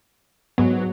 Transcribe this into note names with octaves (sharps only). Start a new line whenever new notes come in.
G#2 F#3 B3